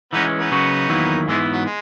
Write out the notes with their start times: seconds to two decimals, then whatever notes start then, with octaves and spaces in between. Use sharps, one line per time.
0.13 E3 G#3 B3 C#4 D#4
0.38 B3 D#4
0.51 C#3 F#3 C#4 F#4
0.89 E2 D#3 F#3 A#3 E4
1.27 G#2 E3 G#3 B3 E4
1.52 F#3
1.66 G#3